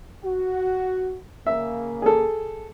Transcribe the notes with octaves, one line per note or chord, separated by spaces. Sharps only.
F#4
C#3 A#3 E5
G#4 A4